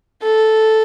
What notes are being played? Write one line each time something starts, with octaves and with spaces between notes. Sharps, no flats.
A4